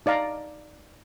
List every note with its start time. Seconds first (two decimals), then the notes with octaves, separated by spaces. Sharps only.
0.06 D#4 D5 F5 A#5